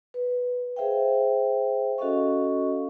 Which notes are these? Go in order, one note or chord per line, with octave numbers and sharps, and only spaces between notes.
B4
G#4 C5 E5 F5 G5
C#4 F#4 A4 D#5 F5 C#6